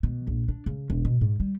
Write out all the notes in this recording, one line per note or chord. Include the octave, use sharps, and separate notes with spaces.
B2
A#1
D4
C#3
E1
B2
G#2
G3